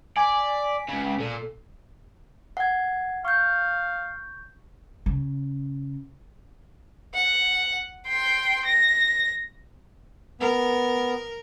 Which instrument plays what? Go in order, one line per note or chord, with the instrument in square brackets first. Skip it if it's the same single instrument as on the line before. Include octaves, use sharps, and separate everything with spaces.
[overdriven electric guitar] D5 [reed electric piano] G#5 [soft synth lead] B6
[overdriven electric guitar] C#2 C#3
[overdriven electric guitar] A#2 [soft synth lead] A4
[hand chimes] F#5 G#6
[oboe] F5 [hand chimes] C#6 G6
[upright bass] C#3
[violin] F#5
G5 C6
A#6
[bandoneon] B3 [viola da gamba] A#4